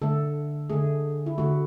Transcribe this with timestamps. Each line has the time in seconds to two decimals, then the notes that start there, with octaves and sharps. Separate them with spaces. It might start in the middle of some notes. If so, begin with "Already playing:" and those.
0.02 D3 A3 A4
0.70 D3 A3 G#4
1.26 E4
1.38 D3 A3 F#4